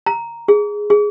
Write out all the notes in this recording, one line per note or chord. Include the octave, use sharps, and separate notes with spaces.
A#5
G#4
G#4